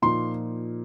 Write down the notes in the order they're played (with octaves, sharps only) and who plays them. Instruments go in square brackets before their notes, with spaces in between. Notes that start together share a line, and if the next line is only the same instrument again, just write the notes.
[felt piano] A#2 F3 A#3 D#4 C6